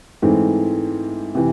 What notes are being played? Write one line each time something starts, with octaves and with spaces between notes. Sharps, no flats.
G#2 E3 A3 C4
C3 E3